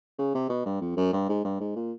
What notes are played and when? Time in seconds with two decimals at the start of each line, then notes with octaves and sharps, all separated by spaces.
0.18 C#3
0.35 C3
0.49 B2
0.66 G2
0.81 F2
0.97 F#2
1.13 G2
1.29 G#2
1.45 G2
1.60 G#2
1.76 A#2